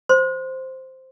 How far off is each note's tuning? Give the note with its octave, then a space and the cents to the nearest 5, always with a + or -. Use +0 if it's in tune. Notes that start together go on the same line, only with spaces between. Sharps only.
C5 +0 C6 +0